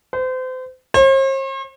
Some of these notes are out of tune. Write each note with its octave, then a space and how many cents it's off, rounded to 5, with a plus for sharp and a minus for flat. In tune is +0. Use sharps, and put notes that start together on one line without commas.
C5 -35
C5 +45